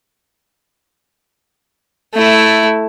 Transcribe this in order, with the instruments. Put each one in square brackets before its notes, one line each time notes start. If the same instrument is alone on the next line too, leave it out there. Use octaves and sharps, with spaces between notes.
[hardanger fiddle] A3 E4